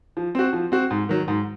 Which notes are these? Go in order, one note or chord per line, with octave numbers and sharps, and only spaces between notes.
F3
C4 F#4
F3
C4 F#4
G#2
D#3 F#3
G#2